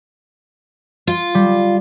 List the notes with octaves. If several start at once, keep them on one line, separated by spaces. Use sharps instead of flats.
F4
G3